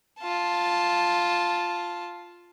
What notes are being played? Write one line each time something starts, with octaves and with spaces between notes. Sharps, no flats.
F4 A5